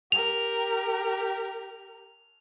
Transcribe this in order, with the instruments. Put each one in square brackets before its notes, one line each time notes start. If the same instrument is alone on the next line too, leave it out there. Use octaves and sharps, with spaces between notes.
[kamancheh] G4 A#4 [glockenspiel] F7